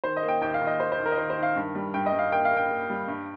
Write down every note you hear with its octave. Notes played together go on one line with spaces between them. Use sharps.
D#3 C5
D#5
A#3
G5
D#2 G5
F5
D#2
D#5
D#3 C5
C5
D#2
A#4
D#5
D#3 C5
C5
D#3
F5
G2
G3
G2 G5
D#5
G2
F5
A#3 G5
F5
A#3
G5
A#3
G3
G2